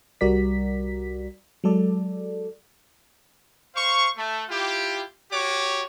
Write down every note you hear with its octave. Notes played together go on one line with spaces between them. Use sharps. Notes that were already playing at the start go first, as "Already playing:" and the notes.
C2 G3 F#4 A#4 D5 B6
F#3 G#3 A4 D5
C5 F5 C#6
A3
E4 F4 G4
F#4 G4 C#5 D6